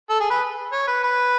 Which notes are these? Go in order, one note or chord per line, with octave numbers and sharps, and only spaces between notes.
A4
G#4
B4
C#5
B4
B4